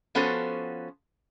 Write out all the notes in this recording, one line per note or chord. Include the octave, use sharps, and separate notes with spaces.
F3 B3 C#4 F#4 A4 C5